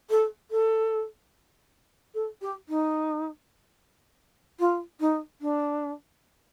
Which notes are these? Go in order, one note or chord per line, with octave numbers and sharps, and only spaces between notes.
A4
A4
A4
G4
D#4
F4
D#4
D4